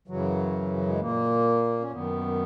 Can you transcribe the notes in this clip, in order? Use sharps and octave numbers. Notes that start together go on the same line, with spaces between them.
F#2 C#3 E3 F#3
F#3
G#3
A#2 A#3
C#4
F#2 D#3 B3